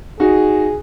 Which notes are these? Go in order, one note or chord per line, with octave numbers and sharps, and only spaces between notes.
D#4 F#4 G#4